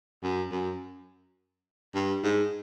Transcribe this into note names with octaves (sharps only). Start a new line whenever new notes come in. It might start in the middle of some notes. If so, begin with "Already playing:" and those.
F#2
F#2
G2
G#2